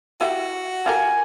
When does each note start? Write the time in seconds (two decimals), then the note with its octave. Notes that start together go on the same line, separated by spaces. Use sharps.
0.21 E4 F#4 G4 G5
0.86 F4 G4 A#4 G#5